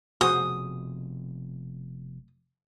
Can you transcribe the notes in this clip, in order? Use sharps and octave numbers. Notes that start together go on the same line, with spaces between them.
F1 F2 B2 F#4 G#4 C5 D#6